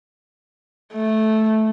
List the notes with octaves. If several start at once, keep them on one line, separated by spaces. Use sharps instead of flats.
A3